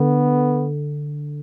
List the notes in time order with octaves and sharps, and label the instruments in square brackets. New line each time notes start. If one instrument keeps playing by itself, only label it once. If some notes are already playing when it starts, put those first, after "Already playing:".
Already playing: [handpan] D3 [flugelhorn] B3